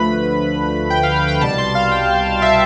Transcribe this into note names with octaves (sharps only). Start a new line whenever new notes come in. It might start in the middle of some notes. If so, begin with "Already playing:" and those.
Already playing: D2 D3 F3 A3 B4 B5
G5
F5
F5
G5
C2 B2 G3 A5
C6
F5
G5
E5